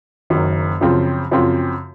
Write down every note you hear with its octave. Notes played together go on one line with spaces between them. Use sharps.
F#1 F#2 D#3
F#2 C#3 F3 C4 F4
F#2 C#3 F3 C4 F4